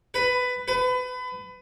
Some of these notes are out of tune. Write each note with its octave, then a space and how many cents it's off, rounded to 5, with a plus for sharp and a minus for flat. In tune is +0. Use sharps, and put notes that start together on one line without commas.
B4 +15
B4 +30